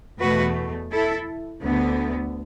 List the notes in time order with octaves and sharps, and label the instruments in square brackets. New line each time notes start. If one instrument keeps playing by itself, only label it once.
[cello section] E2 B2 A3 F#4 B4
E4 A4
D2 D3 B3